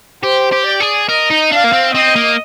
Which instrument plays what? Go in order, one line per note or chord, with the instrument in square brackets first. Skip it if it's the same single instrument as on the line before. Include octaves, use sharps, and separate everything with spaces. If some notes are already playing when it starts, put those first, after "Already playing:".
[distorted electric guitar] G4 [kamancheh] C5
[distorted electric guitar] G4
[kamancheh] D5
[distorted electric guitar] G#4
[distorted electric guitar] A#4 [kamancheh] D#5
[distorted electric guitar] D#4
[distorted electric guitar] D4 [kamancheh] F5
[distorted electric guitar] A#3
C4
[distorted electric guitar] C4 [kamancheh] D#5
[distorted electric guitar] A#3